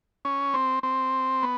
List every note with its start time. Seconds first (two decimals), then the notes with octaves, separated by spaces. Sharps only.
0.25 C#4
0.54 C4
0.83 C4
1.43 B3